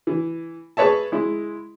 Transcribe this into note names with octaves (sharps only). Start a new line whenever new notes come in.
E3
G#4 B4 C#5 E5 A5
G#3 E4